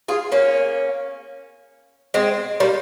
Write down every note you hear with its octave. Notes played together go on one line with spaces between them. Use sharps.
F4 G#4
A#3 C#4
G#3 C4
G3 A#3